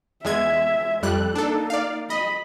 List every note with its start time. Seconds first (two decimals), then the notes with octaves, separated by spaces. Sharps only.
0.25 E2 G#3 E5 G#6
1.03 F2 G3 A4 F#6
1.35 A#3 D4 D#4 A4
1.70 D5 F5
2.10 D#5 B5